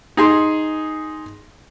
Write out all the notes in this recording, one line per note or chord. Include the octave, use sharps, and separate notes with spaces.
D#4 G#4 C6